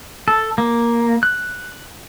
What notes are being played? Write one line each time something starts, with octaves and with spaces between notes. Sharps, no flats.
A4
A#3
F#6